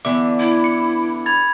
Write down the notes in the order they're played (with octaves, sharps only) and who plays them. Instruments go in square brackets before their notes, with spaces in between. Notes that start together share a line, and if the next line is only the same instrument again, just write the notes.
[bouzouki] D3 E3 [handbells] B3 E5 [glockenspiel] D6
[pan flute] E4
[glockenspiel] C#7
B5 G#6 A6